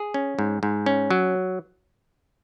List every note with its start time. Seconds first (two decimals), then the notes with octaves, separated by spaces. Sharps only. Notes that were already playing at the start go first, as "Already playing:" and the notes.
Already playing: G#4
0.14 C#4
0.39 G#2
0.63 G#2
0.86 C#4
1.11 F#3